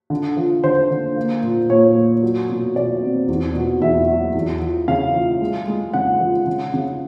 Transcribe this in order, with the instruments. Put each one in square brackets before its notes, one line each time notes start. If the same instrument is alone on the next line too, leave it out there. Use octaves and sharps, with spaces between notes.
[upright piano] D3
F3
D3 C5
D3
A#3
A#2
A#2 C#5
A#3
F#3
B2
B2 D5
C4
E2
B2
E2 E5
F#3
E2
F3
C#3 F5
F3
G#3
G#3
C#3 F#5
F3
C#3
C#3